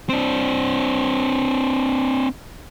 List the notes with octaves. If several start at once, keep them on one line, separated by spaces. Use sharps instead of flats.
C4 D4